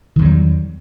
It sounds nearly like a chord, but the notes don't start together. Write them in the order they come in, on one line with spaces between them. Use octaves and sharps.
D#3 E2 F#3 G3